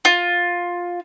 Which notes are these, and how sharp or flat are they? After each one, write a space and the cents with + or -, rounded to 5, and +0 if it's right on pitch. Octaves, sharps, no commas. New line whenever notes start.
F4 +10